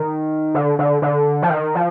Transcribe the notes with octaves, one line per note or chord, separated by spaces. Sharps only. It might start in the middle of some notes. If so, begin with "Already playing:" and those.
Already playing: D#3
D3
D3
D3
F3
D#3
F3